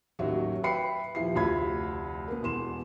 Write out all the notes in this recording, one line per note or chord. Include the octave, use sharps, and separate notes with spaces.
A1 D#2 F#3 F#4 E5
B4 E5 G5 B5 C7 C#7
D#1 F3 E4 C7
F1 D2 F4 B5 G#6
A#3 B3
E1 E2 C6 E7